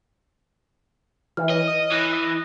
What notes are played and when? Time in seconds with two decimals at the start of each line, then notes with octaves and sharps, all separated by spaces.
1.37 E3 F6
1.50 C#5 D#5
1.67 D#6
1.92 E3 F#6 A#6
2.13 D#5